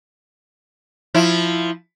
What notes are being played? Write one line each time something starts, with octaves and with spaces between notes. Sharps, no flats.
F3 E4